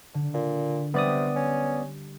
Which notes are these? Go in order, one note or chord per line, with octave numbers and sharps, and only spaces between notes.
D3
A#2
C3 G3 B3 D5 D#6
C#4